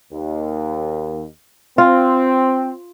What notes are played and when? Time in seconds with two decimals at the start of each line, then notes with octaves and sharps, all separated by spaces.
0.12 D#2
1.78 C4 F4